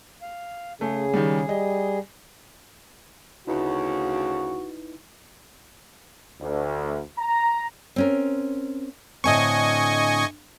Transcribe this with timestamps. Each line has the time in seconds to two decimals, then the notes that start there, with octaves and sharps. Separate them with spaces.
0.22 F5
0.81 C#3 A3 G#4
1.13 D#3 G3
1.49 G3 D#5
3.47 D2 C#3 D#4 E4 F#4 B4
6.40 D2
7.18 A#5
7.96 C4 C#4 A#4
9.24 A2 D3 C4 D#5 G#5 C#6